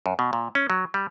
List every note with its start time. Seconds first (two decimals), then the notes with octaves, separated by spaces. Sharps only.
0.06 F#2
0.19 B2
0.33 A#2
0.55 C#4
0.70 F#3
0.94 G3